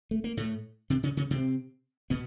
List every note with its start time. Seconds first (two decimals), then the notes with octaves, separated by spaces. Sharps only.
0.11 A3
0.24 A#3
0.37 A2 A3
0.90 C3 C4
1.03 C#3 C#4
1.17 C#3 C#4
1.31 C3 C4
2.10 B2 B3